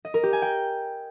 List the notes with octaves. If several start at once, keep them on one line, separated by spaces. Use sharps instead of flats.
D#5
A#4
G4
G#5
G5